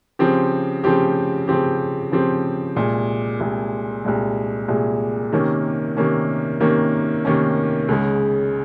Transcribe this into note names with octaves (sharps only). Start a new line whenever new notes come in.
C#3 F3 C4 G4
C#3 F3 C4 G4
C#3 F3 C4 G4
C#3 F3 C4 G4
C2 A#2 G#3
C2 A#2 G#3
C2 A#2 G#3
C2 A#2 G#3
C3 D#3 A#3 C#4
C3 D#3 A#3 C#4
C3 D#3 A#3 C#4
C3 D#3 A#3 C#4
C#2 C#3 G#3